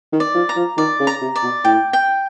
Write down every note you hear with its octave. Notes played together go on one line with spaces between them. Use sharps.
D#3
D5
F3
A#5
F3
D#3 D5
C#3
A#5
C3
D5
B2
A2 G5
G5